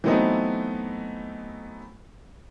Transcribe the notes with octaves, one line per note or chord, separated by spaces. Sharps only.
E3 F#3 A3 B3 C4 D#4